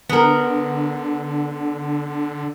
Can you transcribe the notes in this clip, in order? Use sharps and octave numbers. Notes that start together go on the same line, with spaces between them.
D3 B3 A#4